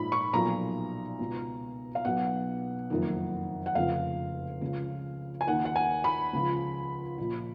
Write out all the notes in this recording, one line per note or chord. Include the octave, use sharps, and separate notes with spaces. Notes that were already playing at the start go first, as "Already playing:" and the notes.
Already playing: A#1 G#2 F3 B5
C#6
B1 A#2 F3 A#5
C#2 B2
F5
B1 B2 F#5
F#1 F2 D#3
F#5
F1 F2 C#3 F3 F5
C#2 C#3 F3
G#5
D#2 D#3 F#5
F#5
G#5
B5
C#2 C#3 F3
A#1 A#2 F3